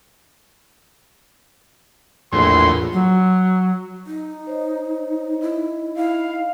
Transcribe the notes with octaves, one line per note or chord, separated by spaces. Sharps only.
A#1 E2 A2 C6
F#3
D#4
C5 C#5 D#5
D#4 E4 D#5
E4 F5